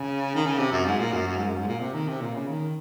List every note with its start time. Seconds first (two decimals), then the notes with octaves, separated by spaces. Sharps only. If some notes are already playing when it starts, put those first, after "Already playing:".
Already playing: C#3
0.35 D#3
0.46 C#3
0.58 C3
0.72 F#2
0.85 G#2
0.99 A#2
1.12 F#2
1.27 F#2
1.37 G#2
1.47 F#2
1.57 G#2
1.67 A#2
1.81 C3
1.94 D#3
2.08 C3
2.21 A#2
2.35 C#3
2.48 D#3